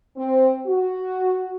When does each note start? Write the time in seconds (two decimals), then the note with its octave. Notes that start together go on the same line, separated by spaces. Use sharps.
0.17 C4
0.66 F#4